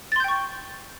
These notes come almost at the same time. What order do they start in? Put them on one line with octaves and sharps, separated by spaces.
A6 C6 G6 G5 C#6